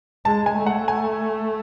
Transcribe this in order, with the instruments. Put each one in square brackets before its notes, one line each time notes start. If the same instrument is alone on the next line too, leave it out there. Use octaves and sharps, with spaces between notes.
[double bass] G#3 [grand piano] A5
[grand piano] G#5
[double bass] A3
[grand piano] F#5
G#5